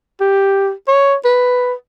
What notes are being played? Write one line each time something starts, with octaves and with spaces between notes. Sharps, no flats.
G4
C#5
B4